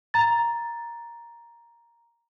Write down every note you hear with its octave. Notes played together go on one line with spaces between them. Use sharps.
A#5 A6